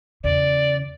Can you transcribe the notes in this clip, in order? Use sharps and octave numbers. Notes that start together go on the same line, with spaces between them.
E2 C#3 D5